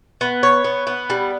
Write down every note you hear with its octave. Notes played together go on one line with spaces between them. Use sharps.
B3
C#5
B3
B3
G3